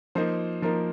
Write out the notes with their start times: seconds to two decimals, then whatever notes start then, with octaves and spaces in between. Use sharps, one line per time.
0.15 F3 A#3 D#4 C5
0.62 F3 A#3 D#4 A#4